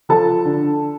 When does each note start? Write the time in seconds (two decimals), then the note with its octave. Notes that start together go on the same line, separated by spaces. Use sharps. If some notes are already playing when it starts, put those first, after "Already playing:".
0.09 F3 A4 A5
0.45 D3